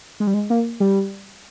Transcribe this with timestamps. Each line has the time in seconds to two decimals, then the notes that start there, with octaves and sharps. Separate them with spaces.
0.20 G#3
0.27 G3
0.34 G#3
0.50 A#3
0.80 G3